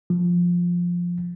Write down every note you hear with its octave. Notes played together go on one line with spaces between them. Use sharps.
F3